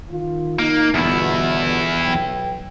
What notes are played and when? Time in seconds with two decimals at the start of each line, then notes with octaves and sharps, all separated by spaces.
0.10 D#3 F4
0.59 A#3 D#4
0.95 G1 E2 B2 E4
2.01 B1 G5